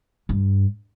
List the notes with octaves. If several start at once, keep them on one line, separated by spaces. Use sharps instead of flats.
G2